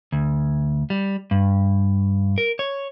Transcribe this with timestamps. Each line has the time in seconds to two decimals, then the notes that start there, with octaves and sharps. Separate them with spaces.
0.12 D2
0.90 G3
1.31 G2
2.38 A#4
2.59 C#5